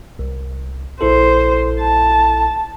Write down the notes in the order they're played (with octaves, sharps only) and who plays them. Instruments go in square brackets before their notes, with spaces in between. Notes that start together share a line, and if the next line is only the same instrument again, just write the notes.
[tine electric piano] C2
[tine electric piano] A#1 E4 A4 [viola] C5
[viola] A5